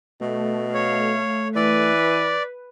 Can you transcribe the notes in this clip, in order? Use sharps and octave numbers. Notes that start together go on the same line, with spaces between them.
B2 A3
C#5 F5
E3 B4 D5